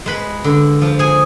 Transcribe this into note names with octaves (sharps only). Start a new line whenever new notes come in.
G#3 B4 B5
D3
F3
G#4 G#5